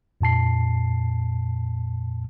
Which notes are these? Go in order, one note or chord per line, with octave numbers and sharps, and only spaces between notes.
F2 A#2 A5 C7